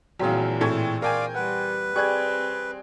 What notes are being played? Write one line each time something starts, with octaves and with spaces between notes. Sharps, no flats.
G1 A#2 E3 F#3 C4 G#4 F5
A2 C4 A4 C#5 G#6
A#4 D5 F5 G5 G#5
G3 B4 F#5
G3 C4 G#4 C#6 F#6 G#6